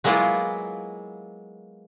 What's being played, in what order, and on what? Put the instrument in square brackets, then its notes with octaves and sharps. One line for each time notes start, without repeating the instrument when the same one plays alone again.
[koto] F#3 G#3 A#3 B3 E4 F4